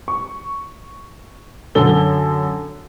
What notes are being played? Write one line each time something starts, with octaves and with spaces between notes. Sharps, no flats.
C#6
F#2 D3 A4 G7